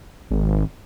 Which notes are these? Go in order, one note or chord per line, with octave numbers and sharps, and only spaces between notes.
G#1